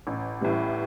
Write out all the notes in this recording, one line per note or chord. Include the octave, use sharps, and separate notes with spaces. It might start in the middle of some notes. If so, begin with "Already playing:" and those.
A1
A2 E3 G3